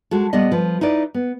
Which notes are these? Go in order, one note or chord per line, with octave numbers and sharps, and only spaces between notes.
G#3 F#4 A4
A#2 G3 B3 D5 D#5
F3 B4
D#4 E4 B4 D5
B3